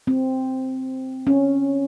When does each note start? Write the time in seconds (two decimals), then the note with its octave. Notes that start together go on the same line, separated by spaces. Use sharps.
0.07 C4
1.27 C#4